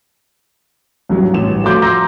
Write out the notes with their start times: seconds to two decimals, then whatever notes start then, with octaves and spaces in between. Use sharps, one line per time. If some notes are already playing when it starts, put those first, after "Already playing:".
1.09 C2 G2 F#3
1.33 A1 G2 E7
1.63 F3 A3 F4 F#4 D6 G6
1.82 A#5 C6 D6 E6 G6 A#6